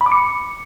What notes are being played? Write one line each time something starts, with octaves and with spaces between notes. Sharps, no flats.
B5
D6
C#7